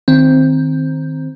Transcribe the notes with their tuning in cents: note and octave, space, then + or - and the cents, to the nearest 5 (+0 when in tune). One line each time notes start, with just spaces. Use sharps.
D#3 +0 C4 +0